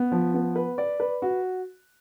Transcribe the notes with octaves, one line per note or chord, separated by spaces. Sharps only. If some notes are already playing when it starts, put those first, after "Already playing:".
Already playing: B3
F3
B3
B4
D5
B4
F#4